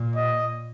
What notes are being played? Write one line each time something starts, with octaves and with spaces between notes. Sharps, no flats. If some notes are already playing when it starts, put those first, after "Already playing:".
Already playing: A#2
D#5